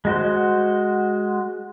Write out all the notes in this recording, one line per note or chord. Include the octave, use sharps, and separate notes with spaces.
G#3 F#4 C5